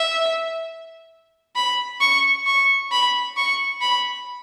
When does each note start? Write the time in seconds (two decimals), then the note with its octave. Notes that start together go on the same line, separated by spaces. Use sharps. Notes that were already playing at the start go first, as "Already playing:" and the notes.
Already playing: E5
1.55 B5
2.01 C#6
2.46 C#6
2.91 B5
3.37 C#6
3.81 B5